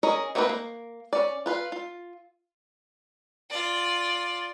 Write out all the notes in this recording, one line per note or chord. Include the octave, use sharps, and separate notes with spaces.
C#4 G#4 A#4 D#5 A#5
A3 A#3 C4 D#4 B4
A#3
C#4 D5
F4 B4 F5
F4
F4 D5